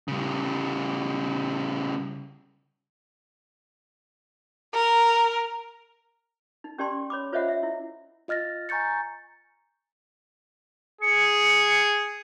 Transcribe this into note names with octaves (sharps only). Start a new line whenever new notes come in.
C#3 G3
A#4
D#4
C#4 G4 D5 A5 C6
C#5 B5 D6
F4 C5 C#5 D#5 E5 F#5
E5
E4
F4 D#5 F6 A6 A#6
G#5 A#5 C#6 G6 A6 C#7
G#4 C#7